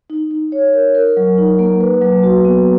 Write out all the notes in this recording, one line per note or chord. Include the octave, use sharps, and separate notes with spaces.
D#4
D#4
C#5
A#4
A#4
F#3
D#4
A#3
B4
F#3
F#4
B3